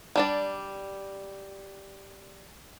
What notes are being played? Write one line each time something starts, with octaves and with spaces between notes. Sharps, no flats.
G3 D4 D5